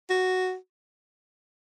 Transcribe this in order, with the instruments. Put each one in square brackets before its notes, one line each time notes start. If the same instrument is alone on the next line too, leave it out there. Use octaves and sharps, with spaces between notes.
[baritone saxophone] F#4